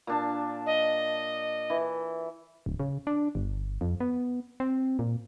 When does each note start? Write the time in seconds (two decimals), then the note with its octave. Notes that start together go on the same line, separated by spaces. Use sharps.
0.07 A#2 D4 A5
0.66 D#5
1.70 E3
2.66 D1
2.80 C#3
3.07 D4
3.35 G1
3.81 F2
4.00 B3
4.60 C4
4.99 A#2